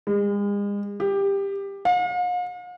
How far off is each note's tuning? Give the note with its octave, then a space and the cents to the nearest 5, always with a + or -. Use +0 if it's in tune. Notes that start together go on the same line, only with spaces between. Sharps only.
G#3 -40
G4 +15
F5 +45